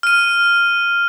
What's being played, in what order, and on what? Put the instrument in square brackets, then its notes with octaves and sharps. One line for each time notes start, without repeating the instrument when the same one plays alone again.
[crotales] F6 D#7